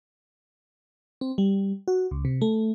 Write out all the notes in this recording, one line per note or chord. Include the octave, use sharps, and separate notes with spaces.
C4
G3
F#4
C#2
C3
A3